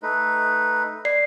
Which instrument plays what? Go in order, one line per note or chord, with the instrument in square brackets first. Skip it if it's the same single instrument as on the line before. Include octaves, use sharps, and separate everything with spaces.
[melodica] A3 D#4 B4
[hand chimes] D5 C7